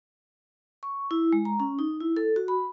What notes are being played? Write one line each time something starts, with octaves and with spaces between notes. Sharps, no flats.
C#6
E4
G#3
A#5
C#4
D#4
E4
A4
F#4
B5